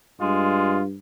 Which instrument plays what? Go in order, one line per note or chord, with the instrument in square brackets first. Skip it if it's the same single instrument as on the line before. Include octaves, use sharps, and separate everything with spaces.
[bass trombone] G2 [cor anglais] G#3 [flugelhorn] F4